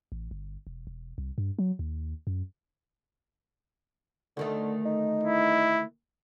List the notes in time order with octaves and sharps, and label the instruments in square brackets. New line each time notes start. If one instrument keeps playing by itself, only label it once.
[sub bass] A1
G1
E1
E1
C2
G2
F#3
D#2
F#2
[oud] D2 D#3 A3 [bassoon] D3
[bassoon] D#4
[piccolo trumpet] E4